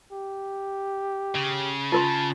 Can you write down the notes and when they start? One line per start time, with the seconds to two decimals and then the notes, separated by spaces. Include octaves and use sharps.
0.12 G4
1.35 C#3
1.92 F4 A#4 A5 C6